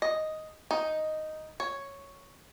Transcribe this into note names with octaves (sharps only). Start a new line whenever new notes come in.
D#5
D#4
C#5